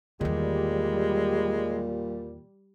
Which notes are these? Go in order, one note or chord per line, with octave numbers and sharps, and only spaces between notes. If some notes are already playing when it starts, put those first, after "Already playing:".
E2 A#2 D#3 G3 G#3